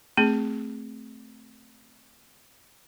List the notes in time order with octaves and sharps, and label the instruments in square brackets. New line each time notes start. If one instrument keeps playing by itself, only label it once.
[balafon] A3 C4 G#4